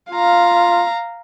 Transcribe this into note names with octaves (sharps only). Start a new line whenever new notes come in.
F4 F5 A#5